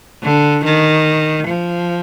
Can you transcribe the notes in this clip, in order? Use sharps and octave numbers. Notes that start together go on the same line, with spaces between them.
D3
D#3
F3